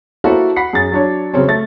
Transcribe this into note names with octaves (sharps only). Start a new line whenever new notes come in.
A#3 E4 F#4 A4 C5 A5
F#5 B5 B6 C7
F#2 G#4 A6
F#3 D4 C#5
C#3 F#3 C4 C#4
A3 A6